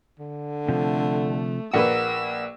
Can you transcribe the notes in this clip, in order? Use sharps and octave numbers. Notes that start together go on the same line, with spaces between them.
D3
C3 F3 A3
A#1 A#3 B4 F#5 E6